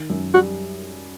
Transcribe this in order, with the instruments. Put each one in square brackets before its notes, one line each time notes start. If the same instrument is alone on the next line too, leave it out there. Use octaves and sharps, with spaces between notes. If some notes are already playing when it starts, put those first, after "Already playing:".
Already playing: [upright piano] D#3
F#2
[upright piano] G3 [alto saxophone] F#4